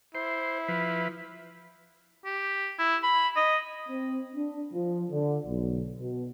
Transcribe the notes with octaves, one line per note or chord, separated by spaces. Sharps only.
E4 C5
F3 B4
G4
E4
B5
D#5
C4
D4
F3
D3
B1
B2